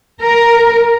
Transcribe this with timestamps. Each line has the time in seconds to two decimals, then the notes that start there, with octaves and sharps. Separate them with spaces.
0.20 A#4